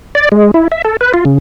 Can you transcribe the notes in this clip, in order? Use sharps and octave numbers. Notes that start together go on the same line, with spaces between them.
D5
G#3
E4
E5
A4
B4
F4
C#3